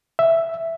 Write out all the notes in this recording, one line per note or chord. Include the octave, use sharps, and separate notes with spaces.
E5